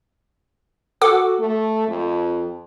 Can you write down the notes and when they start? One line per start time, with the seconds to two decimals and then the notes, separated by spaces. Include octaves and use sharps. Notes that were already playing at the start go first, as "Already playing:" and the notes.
1.02 F#4 A4 F#5 D6
1.39 A3
1.88 F2